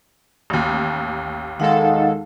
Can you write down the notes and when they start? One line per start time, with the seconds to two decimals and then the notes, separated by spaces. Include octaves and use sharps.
0.50 A1 D#2
1.60 D#3 G#3 D#4 A4 F5 F#5